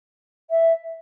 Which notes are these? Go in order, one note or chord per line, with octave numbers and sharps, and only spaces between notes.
E5